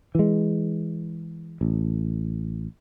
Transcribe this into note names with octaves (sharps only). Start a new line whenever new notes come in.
E3 G#3
A1